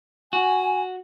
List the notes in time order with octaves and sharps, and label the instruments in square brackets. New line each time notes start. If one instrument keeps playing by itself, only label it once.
[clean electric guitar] F#4 [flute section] G#5